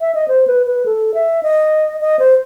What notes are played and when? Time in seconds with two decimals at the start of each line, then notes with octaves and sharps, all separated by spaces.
0.01 E5
0.15 D#5
0.28 C5
0.47 B4
0.67 B4
0.86 A4
1.14 E5
1.43 D#5
2.01 D#5
2.19 C5